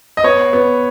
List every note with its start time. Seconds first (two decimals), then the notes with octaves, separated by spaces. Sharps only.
0.17 D#5
0.23 B3 C#5
0.53 B3